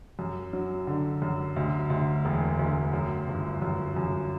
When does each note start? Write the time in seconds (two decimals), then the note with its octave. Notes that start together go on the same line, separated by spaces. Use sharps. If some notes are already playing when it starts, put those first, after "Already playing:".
0.19 F#2
0.53 F#3
0.87 D3
1.22 F#2
1.56 D2
1.90 D2
2.25 E1
2.59 D2
2.93 F#2
3.28 G1
3.62 F#2
3.96 F#2